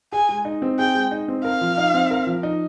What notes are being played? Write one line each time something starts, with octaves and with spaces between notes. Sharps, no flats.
G#4 G#5
G#3
D#4
C4
G#4 G5
G#3
D#4
C4
A#4 F5
F3
D#4
C4
A#4
F3
D#4